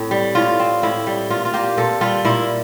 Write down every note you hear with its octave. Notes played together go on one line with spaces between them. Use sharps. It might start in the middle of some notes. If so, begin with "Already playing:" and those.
Already playing: A2 C4
G3
A2 F4
C4
A2 E4
G3
A#2 F4
F4
A#3 G4
A#2 A4
G3 F4
A#2 E4